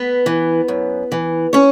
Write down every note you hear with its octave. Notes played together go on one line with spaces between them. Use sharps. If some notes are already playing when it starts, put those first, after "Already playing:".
Already playing: B3 B4
E3
F#2
E3
C#4 C#5